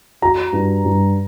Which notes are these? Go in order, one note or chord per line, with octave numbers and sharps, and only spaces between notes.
F#4 A#5
G2
G2